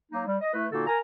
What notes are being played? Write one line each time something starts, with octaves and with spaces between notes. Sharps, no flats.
F#3 A#3 D#4
G3
D#5
A3 E4 B4
A#2 D3 A#3 D#4 F#4 A4
A#4 G#5 A#5